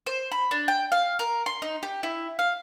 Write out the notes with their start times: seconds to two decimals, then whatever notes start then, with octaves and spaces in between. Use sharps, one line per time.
0.06 C5
0.32 B5
0.51 D4
0.68 G5
0.92 F5
1.19 A#4
1.46 C6
1.62 D#4
1.83 G4
2.03 E4
2.39 F5